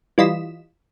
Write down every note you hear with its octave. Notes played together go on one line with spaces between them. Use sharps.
E3 G3 F4 D#5 B6 E7